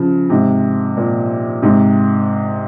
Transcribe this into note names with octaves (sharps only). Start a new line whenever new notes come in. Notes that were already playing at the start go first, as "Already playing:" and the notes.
Already playing: C#3 F3
G#2 C3
A#2
G#2 C3